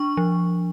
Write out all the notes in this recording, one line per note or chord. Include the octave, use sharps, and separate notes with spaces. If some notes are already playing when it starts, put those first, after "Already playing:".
Already playing: D4 C#6
F3